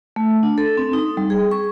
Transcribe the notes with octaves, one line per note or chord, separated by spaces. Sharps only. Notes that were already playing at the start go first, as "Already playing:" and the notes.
A3
D4
A4
C4
D#4
G3
G#4
C#6